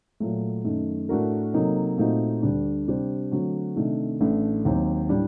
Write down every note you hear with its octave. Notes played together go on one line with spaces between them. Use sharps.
A#2 F#3 A3
F#2 D#3 A3
A2 A3 D4 F#4 A#4
C3 F#3 A#3 D#4 A4
A#2 A3 C4 D#4 F#4
D2 D3 G3 D4
C3 G3 D4 G4 C5
D3 F#3 A3 C4 F#4
C3 D#3 A3 D4
A1 A2 A3 D4
D#2 D#3 F#3 C4
A2 G3 D4